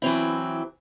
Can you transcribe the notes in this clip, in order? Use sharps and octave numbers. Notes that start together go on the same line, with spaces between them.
E3 F#3 C4 E4